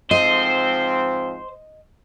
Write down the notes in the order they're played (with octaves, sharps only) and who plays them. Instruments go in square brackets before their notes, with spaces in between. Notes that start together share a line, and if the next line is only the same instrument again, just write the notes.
[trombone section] G#2 F3 C4 [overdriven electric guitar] C5 [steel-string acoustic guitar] D#5